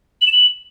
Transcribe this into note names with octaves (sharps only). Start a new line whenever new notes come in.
F#7
E7
F#7